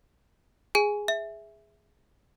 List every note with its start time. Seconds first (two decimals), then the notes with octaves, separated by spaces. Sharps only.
0.75 G#4 G#5
1.08 E5